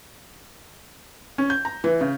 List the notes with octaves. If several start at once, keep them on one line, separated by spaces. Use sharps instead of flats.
C#4
G6
A#5
E3
C#3